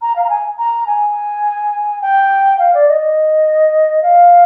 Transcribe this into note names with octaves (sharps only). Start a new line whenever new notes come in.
A#5
F5
A#5
G#5
A#5
G#5
G5
F5
D5
D#5
F5